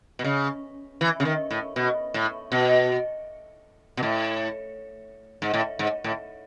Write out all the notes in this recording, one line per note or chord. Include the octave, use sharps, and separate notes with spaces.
B2
C#3
E3
C#3
D#3
A2
B2
A2
B2
B2
A2
G#2
A2
G#2
A2